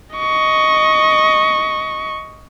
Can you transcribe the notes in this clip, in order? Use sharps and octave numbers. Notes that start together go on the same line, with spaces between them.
D#5 C#6